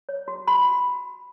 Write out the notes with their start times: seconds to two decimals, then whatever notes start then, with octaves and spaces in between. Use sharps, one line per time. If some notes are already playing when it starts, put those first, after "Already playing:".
0.09 C#5
0.28 F#4
0.47 F#4 B5